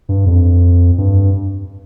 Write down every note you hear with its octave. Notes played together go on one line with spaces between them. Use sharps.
G2
F2
G2